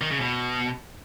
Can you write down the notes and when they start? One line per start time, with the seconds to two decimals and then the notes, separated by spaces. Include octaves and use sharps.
0.01 D#3
0.11 C#3
0.21 B2